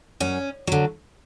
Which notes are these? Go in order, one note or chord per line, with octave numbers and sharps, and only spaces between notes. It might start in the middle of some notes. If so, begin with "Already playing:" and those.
F#2 C#4
D3 F#3